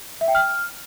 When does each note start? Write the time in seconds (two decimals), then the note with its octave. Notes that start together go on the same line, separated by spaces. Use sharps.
0.21 E5
0.28 G5
0.35 F6